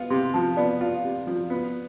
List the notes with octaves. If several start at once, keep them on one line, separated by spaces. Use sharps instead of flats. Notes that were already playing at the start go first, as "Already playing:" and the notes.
Already playing: B3 F4
C3 C6
F3 A5
B3 D5
F4
C3
F3
B3